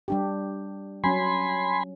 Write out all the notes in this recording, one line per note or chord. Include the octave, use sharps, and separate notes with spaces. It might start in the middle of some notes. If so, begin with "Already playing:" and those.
G3 D4 G4
F#3 C#4 G#5 B5 C6